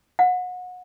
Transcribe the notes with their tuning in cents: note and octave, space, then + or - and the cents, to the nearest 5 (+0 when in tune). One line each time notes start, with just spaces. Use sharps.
F#5 -30